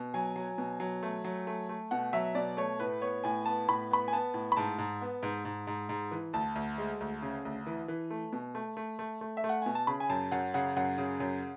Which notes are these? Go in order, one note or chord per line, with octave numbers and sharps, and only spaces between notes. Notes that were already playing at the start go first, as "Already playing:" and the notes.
Already playing: B2
F#3 G#5
F#3
B2
F#3
A3
F#3
A3
A3
B2 F#5
F#3 E5
B2 D5
A3 C#5
A2 B4
B3 C#5
A2 G#5
B3 A5
A2 B5
B3 B5
G#5
B3 A5
A2
B5
G#2 A5
G#2
B3
G#2
G#2
G#2
G#2
E3
D2 A5
D2
G#3
D2
C#3
D2
E3
E3
A3
B2
A3
A3
A3
A3
E5
A3
F#5
B2 G#5
A5
C#3 B5
G#5
F#2 A5
F#2 F#5
C#3 F#5
F#2 F#5
C#3
F#2